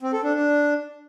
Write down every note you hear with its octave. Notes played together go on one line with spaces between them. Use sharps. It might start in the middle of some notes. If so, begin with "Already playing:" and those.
C4
A4
D4
D4